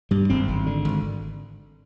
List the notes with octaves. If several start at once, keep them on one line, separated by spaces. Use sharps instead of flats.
G2 G3
G#1 C4
G#1
D3
G#1